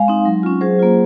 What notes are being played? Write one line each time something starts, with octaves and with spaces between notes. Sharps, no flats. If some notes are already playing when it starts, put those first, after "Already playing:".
Already playing: G#3 F5 G#5
C4 D#4
F#3
C#4 F4
F#3 G#4 C5
A#3 F4